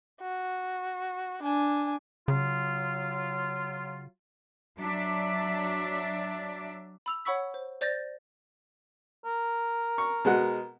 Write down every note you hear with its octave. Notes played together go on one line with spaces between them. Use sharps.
F#4
D4 G#5
C#3 F#3 F4
F#3 D4 D5 E5
B5 E6 F7
C#5 F#5 B5 C#6 E6 B6
C5
C5 D5 G6 A6 A#6
A#4
C#6
B2 G#3 F#5